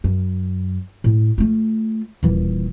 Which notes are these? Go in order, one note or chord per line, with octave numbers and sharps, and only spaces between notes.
F#2
A2
A3 F4
D#1 E3